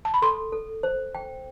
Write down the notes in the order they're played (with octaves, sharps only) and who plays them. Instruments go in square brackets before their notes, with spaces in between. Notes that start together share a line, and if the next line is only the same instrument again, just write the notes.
[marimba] A5
B5
[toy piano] A4 [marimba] C6
[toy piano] A4
C5
G5